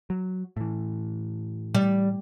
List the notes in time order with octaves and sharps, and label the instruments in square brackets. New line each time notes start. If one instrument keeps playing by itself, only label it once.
[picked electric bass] F#3
A2 E3
[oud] G3